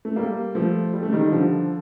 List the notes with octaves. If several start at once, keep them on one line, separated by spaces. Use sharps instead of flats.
A3
G3 A#3
F3 A3
G3
A3
D#3 G3
D3 F3